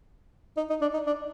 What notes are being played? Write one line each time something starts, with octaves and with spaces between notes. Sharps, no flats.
D#4
D#4
D4
D#4
D4